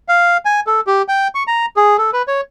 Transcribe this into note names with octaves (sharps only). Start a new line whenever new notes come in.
F5
G#5
A4
G4
G5
C#6
A#5
G#4
A4
B4
C#5